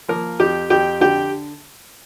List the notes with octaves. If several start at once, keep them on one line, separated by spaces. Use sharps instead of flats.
F3 A#3 A#4
F2 G4 G5
F2 G4 G5
D3 G4 G5